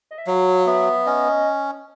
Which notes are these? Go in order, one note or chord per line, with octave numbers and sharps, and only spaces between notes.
D#5
E5
F#3 F5
B3 E5
C#4 D#5